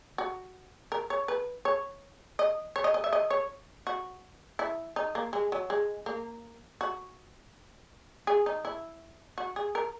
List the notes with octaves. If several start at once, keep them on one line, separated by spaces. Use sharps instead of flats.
F#4
A#4
C#5
B4
C#5
D#5
C#5
D#5
D#5
E5
D#5
C#5
F#4
E4
D#4
A#3
G#3
F#3
G#3
A#3
F#4
G#4
D#4
E4
F#4
G#4
A#4